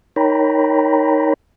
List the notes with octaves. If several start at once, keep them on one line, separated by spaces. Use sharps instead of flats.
D#4 A#4 C#5 G5 A#5 B5